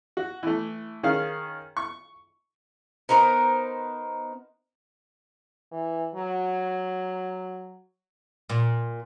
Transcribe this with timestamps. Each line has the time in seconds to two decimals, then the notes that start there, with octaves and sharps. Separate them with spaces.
0.17 F#4
0.43 E3 A3
1.03 D#3 C#4 G#4 F5
1.77 C#6
3.09 B3 D#4 A#4 C5
5.72 E3
6.15 F#3
8.49 A#2